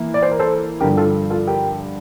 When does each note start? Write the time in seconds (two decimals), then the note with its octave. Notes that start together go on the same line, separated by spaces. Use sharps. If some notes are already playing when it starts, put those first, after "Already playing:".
Already playing: E3 A#3 E4
0.14 D5
0.23 C5
0.31 A#4
0.39 A4 C5
0.80 G2 D3 F3 G4 A#4
0.97 F4 A4
1.30 F4 A4
1.47 G4 A#4